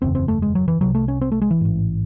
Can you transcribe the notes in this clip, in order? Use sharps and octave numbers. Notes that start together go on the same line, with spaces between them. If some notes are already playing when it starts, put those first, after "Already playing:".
F#1 E2 C#3 C4
C4
A3
G#3
F#3
E3
C2 C3 F#3
A3
C#4
C4
A3
G#3
E3
A1 G#2